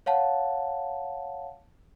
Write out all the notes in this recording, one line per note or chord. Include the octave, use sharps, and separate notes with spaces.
C#5 F5 F#5 A5